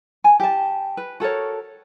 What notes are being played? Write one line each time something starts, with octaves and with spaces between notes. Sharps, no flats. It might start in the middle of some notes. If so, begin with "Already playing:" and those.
G#5
G4 A5
B4
F#4 A4 A#4 C#5